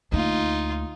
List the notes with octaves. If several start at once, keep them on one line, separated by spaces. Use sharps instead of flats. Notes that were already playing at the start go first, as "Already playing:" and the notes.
D2 A#3 D#4 F4